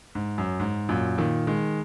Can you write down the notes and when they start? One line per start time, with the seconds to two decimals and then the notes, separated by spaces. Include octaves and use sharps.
0.15 G#2
0.38 F#2
0.60 G#2
0.89 F#2 A#2
1.18 A#2 D#3
1.47 D#3 G#3